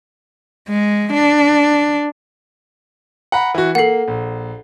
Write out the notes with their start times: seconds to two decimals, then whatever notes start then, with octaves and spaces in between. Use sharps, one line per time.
0.68 G#3
1.13 D4
3.32 F#5 A#5 B5
3.54 E3 F#4
3.75 A#3 A4 F#5 C7
4.08 A#1